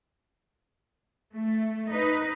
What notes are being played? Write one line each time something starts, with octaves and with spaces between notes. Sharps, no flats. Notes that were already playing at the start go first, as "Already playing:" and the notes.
A3
D#4 B4